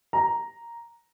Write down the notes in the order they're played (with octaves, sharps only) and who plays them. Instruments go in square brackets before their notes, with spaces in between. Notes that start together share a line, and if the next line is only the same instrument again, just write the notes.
[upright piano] A#5